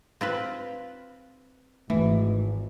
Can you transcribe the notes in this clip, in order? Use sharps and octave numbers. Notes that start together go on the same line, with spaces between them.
C4 F4 B4
G#1 E3 A3